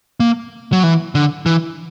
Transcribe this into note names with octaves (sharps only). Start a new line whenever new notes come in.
A#3
F#3
E3
D3
E3